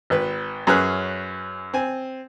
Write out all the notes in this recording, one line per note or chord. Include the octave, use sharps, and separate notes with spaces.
G#1 B4
F#2 C#4 G#4 B4 F6 F#6
C4 G#5